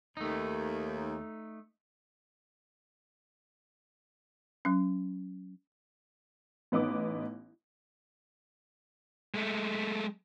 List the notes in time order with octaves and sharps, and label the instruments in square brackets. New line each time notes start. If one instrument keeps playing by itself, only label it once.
[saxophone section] D#2 [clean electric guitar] A3 D#4
[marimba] F#3 C#4
[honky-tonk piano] A1 B3 D#4 D6
[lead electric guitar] G#3 A3